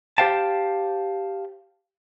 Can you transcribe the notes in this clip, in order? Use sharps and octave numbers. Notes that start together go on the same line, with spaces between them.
G4 C5 F5 G5 A5